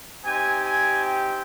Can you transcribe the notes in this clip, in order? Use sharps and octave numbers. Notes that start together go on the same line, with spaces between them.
C4 D#4 G4 G#5
G#5
G5